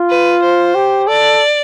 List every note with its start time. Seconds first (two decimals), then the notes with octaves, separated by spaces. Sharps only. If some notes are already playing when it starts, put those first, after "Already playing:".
Already playing: F4
0.10 B4
0.42 C5
0.75 G4
1.07 A4 D5